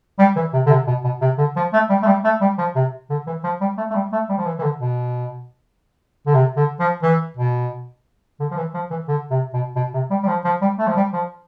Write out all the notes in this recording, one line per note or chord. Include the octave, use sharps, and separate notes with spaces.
G3
E3
C3
D3
C3
B2
B2
C3
D3
F3
A3
G3
A3
G3
A3
G3
F3
C3
D3
E3
F3
G3
A3
A3
G3
A3
G3
F3
E3
E3
D3
B2
D3
C3
D3
F3
E3
B2
D3
F3
E3
F3
E3
D3
C3
B2
B2
C3
G3
G3
F3
F3
G3
A3
F3
G3
F3